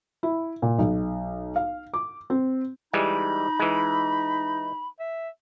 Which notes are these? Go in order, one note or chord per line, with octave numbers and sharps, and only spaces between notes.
E4
A#2
B1
F5
D6
C4
E3 G3 G#3 D#4 B5
E3 G#3
E5